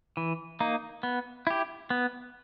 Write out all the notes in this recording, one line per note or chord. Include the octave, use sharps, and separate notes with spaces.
E3
A#3 D#4
B3
E4 G4
B3